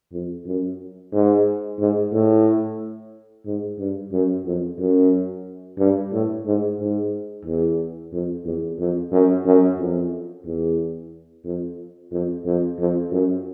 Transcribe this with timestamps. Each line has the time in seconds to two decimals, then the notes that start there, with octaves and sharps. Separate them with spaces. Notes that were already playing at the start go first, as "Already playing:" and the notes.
0.13 F2
0.47 F#2
1.13 G#2
1.79 G#2
2.13 A2
3.46 G#2
3.79 G2
4.12 F#2
4.45 F2
4.79 F#2
5.79 G2
6.12 A2
6.46 G#2
6.79 G#2
7.45 E2
8.12 F2
8.45 E2
8.79 F2
9.12 F#2
9.46 F#2
9.79 F2
10.46 E2
11.45 F2
12.12 F2
12.46 F2
12.79 F2
13.12 F#2